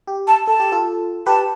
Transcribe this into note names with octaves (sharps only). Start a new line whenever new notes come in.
G4
A5
A4 A5
G4
F4 A4
G4 B4 A5